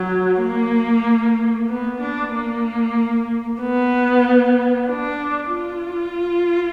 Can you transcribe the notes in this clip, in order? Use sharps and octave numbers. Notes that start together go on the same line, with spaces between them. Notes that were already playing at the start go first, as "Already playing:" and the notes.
Already playing: F#3
A#3
B3
D4
A#3
B3
D4
F4